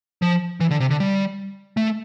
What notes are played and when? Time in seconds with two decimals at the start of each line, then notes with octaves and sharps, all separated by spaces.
0.22 F3
0.60 E3
0.71 D3
0.80 C3
0.90 D3
1.00 G3
1.77 A3